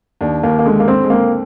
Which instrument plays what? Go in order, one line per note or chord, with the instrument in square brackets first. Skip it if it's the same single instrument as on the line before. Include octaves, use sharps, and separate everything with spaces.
[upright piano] D#2 [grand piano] D4
[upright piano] D#2 [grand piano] A#3
[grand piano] A#3
[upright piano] D3 [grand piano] G#3
[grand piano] A#3
[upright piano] G#2 [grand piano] C4
[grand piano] G#3
[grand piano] A#3 [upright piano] C4